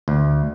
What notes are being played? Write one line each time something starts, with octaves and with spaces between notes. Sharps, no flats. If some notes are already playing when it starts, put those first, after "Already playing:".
D2